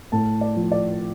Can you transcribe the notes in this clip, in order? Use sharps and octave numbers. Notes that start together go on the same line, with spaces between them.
A2 A5
D5
F3
D5